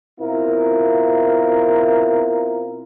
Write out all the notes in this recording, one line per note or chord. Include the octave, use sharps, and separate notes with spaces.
B2 C4 E4 F4 A#4